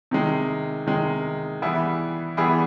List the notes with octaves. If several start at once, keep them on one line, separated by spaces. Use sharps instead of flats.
C3 D#3 G#3
C3 D#3 G#3
E3 G3 B3 E4 G#4
E3 G3 B3 E4 G#4